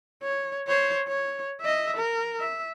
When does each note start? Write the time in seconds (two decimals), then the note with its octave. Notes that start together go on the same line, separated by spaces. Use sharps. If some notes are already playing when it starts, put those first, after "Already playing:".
0.23 C#5
0.67 C5 C#5
1.08 C#5
1.61 D#5 E5
1.96 A#4
2.40 E5